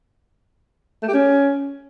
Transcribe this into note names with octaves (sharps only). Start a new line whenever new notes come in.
A3
G4
C#4